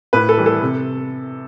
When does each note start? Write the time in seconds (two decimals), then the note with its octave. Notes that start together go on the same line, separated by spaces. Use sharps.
0.13 A2 B4
0.29 A4
0.37 E3 G3
0.46 A4
0.61 C3